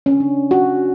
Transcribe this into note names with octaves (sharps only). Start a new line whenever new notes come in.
C#4
D4
F#4